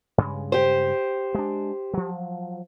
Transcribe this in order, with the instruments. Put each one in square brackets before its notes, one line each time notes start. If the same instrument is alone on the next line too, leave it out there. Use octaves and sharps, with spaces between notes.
[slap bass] G2 C#3 G#3
[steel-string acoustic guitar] G4 C5
[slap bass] G#3 D4
F3 F#3